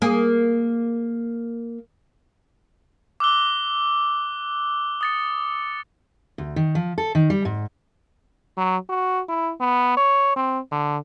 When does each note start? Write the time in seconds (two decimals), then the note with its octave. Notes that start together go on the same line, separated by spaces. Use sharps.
0.02 A#3 G#4
3.20 D6 E6 F#6 G7
5.01 D#6 A6 C#7
6.38 D2
6.56 D#3
6.75 F3
6.98 A4
7.15 D#3
7.30 G3
7.45 G#2
8.57 F#3
8.89 F#4
9.28 E4
9.60 B3
9.97 C#5
10.36 C4
10.71 D3